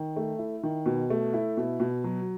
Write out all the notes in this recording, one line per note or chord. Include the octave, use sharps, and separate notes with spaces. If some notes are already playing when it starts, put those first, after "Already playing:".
Already playing: D#3
A3
E4
D#3
B2
A3
E4
B2
B2
F#3